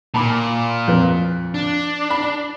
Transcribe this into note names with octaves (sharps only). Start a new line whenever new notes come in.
A#2 A5 B5 D6
F2 B4
D4
B5